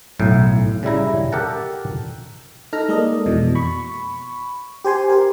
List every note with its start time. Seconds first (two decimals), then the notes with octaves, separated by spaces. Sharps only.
0.19 B1 A2
0.83 C#3 G3 E4 A#5
1.32 G4 A4 A#4 F#5 A5
2.73 D#4 A4 F6 A#6
2.89 G#3 A#3 A4 D5 D#5
3.26 F2 B2 E3
3.55 B5 C#6
4.85 G4 C5 G#5 C6
5.10 G4 A#4